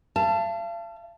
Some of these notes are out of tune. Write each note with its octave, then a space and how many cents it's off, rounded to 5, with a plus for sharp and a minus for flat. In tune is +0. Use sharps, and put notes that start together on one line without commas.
F5 -40 A5 +5